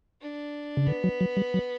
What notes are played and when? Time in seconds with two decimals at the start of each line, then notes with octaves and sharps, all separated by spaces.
0.21 D4
0.77 C#3
0.87 D3 B3
1.04 F#3
1.21 F#3
1.37 G3
1.54 F#3